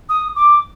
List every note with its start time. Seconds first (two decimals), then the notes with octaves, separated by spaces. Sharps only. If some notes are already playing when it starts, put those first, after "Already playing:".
0.09 D#6
0.35 D6